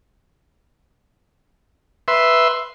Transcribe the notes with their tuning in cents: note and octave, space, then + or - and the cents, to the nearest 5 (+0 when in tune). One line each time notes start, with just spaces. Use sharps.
B4 +0 E5 +0 C6 +0